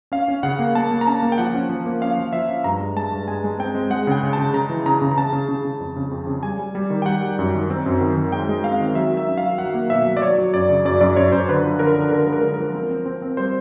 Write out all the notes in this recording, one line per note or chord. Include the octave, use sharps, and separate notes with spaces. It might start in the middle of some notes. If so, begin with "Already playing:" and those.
C#4 F5
C#4
C#3 F#5
A#3
A#3 A5
A#3
A#5
C#4 A5
A#3
G5
F3 F#5
C#4
F3
A#3
C#4 F5
F3
F3 E5
C#4
G2 A#5
G#3
G#3 A5
G2
G#3 G#5
G#3
C4 G5
G#3
G#3 F#5
C#3 G5
C#3
C#3 A5
C#3 A#5
E3
C#3 A#5
C#3
A#5
C#3 A5
C#3
C#3
C#3
F2
C#3
F2
C#3
G3 G#5
G3
G3
D#3
G5
G3 F#5
G3
F#2
D#3
C4
F#2
D#3
D#3
G#3 G5
G#3
C4 F5
D#3
F#3 E5
F#3
E5
C#4
F5
F#3
F#3 F#5
A#3
B2 E5
F#3
D5
F#3 C#5
F#3
F#2 D5
C#3
F#2 D5
F#2 D5
F#2 C#5
F#2 C5
D3 B4
F3
D3 A#4
D3
D3 A#4
G#3
A#4
D3
A#4
F3
C4
C4
C4
C4
G3 C5